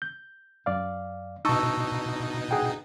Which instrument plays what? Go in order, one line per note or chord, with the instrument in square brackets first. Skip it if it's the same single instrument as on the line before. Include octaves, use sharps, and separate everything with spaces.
[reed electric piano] G6
F#2 D5 F5
[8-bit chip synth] B2 D#4 [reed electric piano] A5 C#6 E6
[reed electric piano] G#4 F#5 G5